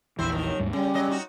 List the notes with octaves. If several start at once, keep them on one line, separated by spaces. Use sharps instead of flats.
A#1 E2 E3 C4 E4 C5
D#2 D#3
D#2 G#2 G3
C#3 G3 C#4
C#3 F#3 D#5
A#2 D#4 F#4